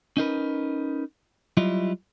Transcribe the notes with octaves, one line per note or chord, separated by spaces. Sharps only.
C#4 D#4 A#4 B4
F#3 G3 E4 F4 D#5